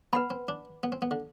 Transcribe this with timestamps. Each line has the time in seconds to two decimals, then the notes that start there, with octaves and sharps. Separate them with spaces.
0.13 B3 B4 F#5 B5
0.30 C4
0.48 D4
0.83 B3
0.92 C4
1.02 B3
1.11 D3